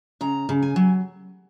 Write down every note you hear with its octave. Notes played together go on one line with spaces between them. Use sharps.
C#3 A#5
C#3
G#5
F#3